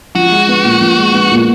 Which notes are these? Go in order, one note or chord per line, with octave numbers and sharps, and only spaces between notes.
F3 F#4
G#3
B3
A#2
F3
G#3
B3
A#2